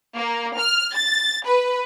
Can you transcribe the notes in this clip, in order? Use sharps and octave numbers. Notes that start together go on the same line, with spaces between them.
A#3
F6
A6
B4